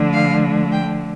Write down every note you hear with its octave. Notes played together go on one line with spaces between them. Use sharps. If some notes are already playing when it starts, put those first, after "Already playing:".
Already playing: D3 F3 A3
F5
G5